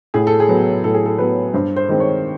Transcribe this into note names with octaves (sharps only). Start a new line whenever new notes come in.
A2 G#4
A4
G#4
F#3 B3
A2 A4
G#4
A4
F#3 B3 B4
G2 C5
C5
D#3 G#3 C4
C#5